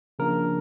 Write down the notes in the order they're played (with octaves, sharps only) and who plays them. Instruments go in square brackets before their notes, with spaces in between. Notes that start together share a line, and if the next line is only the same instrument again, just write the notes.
[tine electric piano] C#3 F3 A#3 D4 A#4